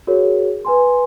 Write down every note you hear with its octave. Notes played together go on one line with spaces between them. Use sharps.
F#4 G#4 A#4 C#5
B4 G#5 C6